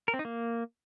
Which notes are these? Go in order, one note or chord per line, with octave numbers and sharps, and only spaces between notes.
A#4
C4
D#4
A#3